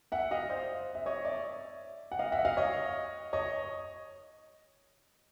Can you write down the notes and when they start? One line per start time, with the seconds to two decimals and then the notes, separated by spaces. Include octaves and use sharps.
0.12 E5 F#5
0.31 D#5 F5
0.49 C5 D5
0.95 E5
1.06 C#5 D#5
1.25 D5 E5
2.12 F#5
2.19 D#5 F5
2.32 E5 F#5
2.45 D#5 F5
2.57 C#5 D#5
3.33 C#5 D#5